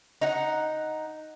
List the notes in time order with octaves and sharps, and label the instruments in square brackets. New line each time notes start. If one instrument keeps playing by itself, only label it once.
[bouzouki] D#4 F#5